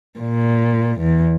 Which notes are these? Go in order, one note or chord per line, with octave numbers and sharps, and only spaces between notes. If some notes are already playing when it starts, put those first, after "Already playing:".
A#2
E2